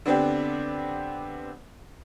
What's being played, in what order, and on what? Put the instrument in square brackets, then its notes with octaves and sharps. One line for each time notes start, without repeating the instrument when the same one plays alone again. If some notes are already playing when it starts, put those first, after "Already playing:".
[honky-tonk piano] D3 B3 C4 D4 G4